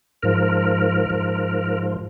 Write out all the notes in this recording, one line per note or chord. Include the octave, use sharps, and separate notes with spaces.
G#2 F3 A#4
G#2 F3